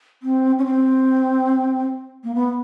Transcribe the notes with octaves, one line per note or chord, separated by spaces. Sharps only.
C4
C#4
C4
A#3
B3